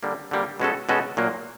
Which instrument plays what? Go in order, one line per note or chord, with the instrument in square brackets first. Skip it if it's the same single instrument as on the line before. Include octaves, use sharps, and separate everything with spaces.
[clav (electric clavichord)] D3 G3 A#3
D3 G3 A#3
B2 G#3 C#4 F#4 A4
B2 G#3 C#4 F#4 A4
A#2 F#3 A#3